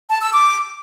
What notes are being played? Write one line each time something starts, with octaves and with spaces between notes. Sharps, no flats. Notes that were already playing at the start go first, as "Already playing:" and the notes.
A5
E6
D6